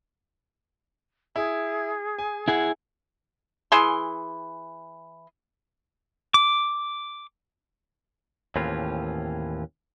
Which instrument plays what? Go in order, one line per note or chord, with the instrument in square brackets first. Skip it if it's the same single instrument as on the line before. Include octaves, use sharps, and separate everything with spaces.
[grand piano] E4 [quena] G#4
[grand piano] G#5
[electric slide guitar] E4 G#4 [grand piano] F#5
[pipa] E3 G#4 C6
[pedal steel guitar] D6
[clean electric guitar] D#2 A2 E3 C4 C#4 F4